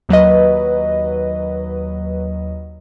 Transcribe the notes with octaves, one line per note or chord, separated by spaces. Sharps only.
D#2 F#3 B4 D#5